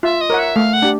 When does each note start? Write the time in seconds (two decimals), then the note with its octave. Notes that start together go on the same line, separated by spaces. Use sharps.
0.03 F4 E5
0.21 D#5
0.30 A#4 C#5 F#5
0.39 E5
0.56 A3 F5
0.73 F#5
0.82 D4 G4